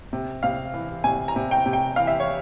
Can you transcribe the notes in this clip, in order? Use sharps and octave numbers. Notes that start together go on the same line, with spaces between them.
C3
C3 F5
E3
C3 G#5
A#5
C3
G5
C3
G5
E3 F5
E5
C#5